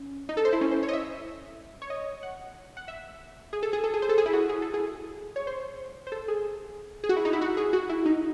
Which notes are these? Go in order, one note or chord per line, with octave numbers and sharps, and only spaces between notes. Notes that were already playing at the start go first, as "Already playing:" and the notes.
Already playing: C#4
D#4
A4
C5
E4
C#4
C5
C#5
D#5
E5
C#5
D#5
F#5
F#5
E5
G#4
A4
G#4
A4
G#4
C5
A4
G#4
E4
F#4
G#4
A4
G#4
C#5
C5
C5
A4
G#4
G#4
F#4
E4
D#4
E4
F#4
G#4
F#4
E4
D#4